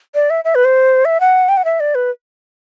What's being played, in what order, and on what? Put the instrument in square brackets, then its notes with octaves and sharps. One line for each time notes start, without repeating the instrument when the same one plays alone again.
[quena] D5
E5
E5
B4
C5
E5
F#5
G5
F#5
E5
D5
B4